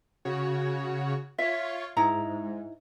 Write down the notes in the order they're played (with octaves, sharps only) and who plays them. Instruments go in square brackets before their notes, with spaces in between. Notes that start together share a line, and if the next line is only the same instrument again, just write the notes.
[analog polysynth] C#3 F#4 C#5
[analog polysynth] F4 C#5 [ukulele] E5
[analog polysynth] G#2 [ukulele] D#4 E4 A#5